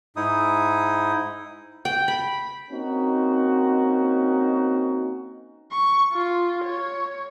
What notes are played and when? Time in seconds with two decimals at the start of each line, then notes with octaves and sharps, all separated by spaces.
0.16 G#2 D#4 E4 D#6
1.85 G5
2.08 B5
2.71 A#3 C4 C#4 D#4 F#4
5.71 C#6
6.13 F4
6.65 C#5